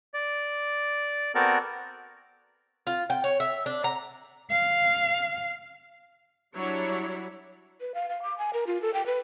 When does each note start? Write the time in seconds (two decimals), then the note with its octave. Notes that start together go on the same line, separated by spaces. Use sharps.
0.14 D5
1.35 B3 C4 F#4 A4 A#4 D5
2.87 F4
3.10 G5
3.24 C#5
3.40 E5
3.66 D4
3.84 A#5
4.50 F5
6.55 F#3 G3 D4 E4 C#5
7.81 B4
7.94 F5
8.09 F5
8.22 D6
8.38 G#5
8.53 A#4
8.67 F4
8.82 A4
8.94 G5
9.06 B4